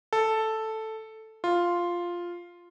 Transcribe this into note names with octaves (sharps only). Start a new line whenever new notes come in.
A4
F4